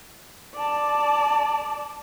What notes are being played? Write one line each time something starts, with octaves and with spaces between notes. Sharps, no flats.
D5 A5